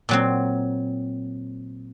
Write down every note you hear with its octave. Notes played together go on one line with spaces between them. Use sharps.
A#2 F#3 C4